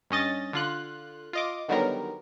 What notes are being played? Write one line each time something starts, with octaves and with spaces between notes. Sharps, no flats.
G2 C#4 D#5 A6
D3 F4 F#6
F4 D#5 D6
D3 D#3 F#3 G3 B3 A#4